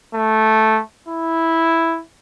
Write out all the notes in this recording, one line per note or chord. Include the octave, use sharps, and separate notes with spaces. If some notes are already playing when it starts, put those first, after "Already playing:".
A3
E4